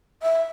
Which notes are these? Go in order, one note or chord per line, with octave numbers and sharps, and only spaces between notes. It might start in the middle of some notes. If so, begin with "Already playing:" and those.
E5